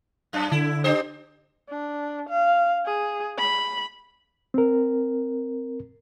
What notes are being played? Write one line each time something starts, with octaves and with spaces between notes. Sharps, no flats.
F#2 D4
D3 E4
D4 G4 C5
D4
F5
G#4
B5
C4 A#4